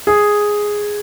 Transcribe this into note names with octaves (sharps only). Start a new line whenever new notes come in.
G#4